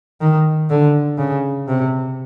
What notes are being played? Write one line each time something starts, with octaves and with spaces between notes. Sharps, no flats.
D#3
D3
C#3
C3